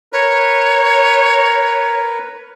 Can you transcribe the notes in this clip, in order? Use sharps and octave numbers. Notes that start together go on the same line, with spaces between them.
A#4 B4 C#5